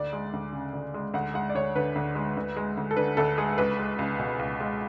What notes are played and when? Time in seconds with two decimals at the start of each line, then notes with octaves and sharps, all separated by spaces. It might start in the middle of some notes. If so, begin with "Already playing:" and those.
Already playing: D2 D5
0.13 G#3
0.33 D2
0.53 C#3
0.73 D2
0.94 G#3
1.14 D2 F#5
1.34 G#3 F#5
1.50 D5
1.55 D2 C#5
1.75 D3 B4
1.95 D2
2.15 G#3
2.37 D2
2.57 G#3
2.77 D2
2.91 A4
2.97 D3 B4
3.17 D2 A4
3.38 G#3 G#4
3.58 C#2 B4
3.79 G#3
3.99 C#2
4.19 B2
4.39 C#2
4.60 G#3